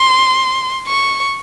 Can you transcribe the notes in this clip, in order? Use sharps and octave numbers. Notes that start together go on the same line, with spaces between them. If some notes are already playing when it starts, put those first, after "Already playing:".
Already playing: C6
C#6